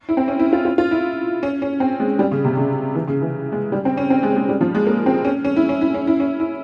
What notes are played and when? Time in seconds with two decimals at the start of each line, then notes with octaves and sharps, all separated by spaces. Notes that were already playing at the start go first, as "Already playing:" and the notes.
0.09 E4
0.17 C4
0.28 C#4
0.39 E4
0.53 F4
0.65 F4
0.78 F4
0.91 E4
1.43 C#4
1.62 C#4
1.80 C4
2.00 G#3
2.19 G3
2.31 C#3
2.44 C3
2.57 C#3
2.95 E3
3.07 C#3
3.21 E3
3.52 G#3
3.72 G3
3.85 C4
3.97 C#4
4.10 C4
4.23 G#3
4.36 G#3
4.49 G3
4.61 F3
4.75 G#3
4.87 A#3
5.06 C4
5.24 C#4
5.45 C#4
5.56 E4
5.69 C#4
5.81 E4
5.94 C#4
6.07 E4
6.20 C#4
6.40 E4